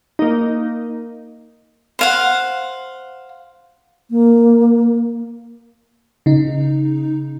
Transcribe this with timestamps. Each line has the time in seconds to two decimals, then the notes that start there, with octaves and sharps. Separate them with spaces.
0.19 A#3 D#4
1.99 C5 F5 F#5
4.11 A#3
6.26 C#3 D#4